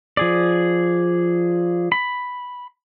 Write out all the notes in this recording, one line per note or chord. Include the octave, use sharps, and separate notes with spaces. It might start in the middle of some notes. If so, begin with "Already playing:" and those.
F3 G#4 D5
B5